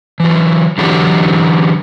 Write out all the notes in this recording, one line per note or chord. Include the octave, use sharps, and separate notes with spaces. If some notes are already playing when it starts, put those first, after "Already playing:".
E3 F#3
D3 E3 F#3 F#4 G4